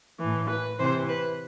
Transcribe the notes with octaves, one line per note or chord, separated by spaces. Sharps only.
A2 E3
B4
C3 E3 C5
B4